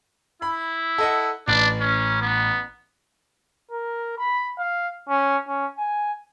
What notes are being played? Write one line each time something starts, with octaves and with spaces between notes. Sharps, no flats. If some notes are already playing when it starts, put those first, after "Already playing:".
E4 B5
A4 D#5 F#5
A1 D4
C#4
B3
A#4
B5
F5
C#4
C#4
G#5